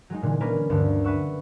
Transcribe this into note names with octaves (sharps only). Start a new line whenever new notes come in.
F#3 G#3 D#4
A#2 D3 E3 D#4
A#3 C#4 D4 A#4 B4
D2 G2 D3
B4 E5 F#5 C#6 E6